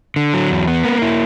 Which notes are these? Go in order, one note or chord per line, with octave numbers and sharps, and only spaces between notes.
D3
F#3
E2
B3
A#3
E4